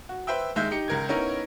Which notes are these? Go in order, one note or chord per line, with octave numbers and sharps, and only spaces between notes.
F#4
B4 C5 E5 G5 E6
D#2 G#3 E5 G6
D#4 G4 C#7
C#2 A#4 G#6
B3 C#4 D#4 E4 A#4